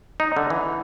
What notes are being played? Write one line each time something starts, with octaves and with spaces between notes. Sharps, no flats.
D#4
D3
E3